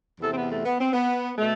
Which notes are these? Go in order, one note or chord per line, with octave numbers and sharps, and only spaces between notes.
E2 C3 E3 A4
C4
B3
A3
B3
C4
B3
B2 A3